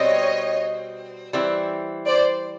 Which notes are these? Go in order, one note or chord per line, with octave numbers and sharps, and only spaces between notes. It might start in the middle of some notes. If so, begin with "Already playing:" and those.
Already playing: B2 G3 C4 C#5 D#5
E3 G3 C4 E4
C5 D5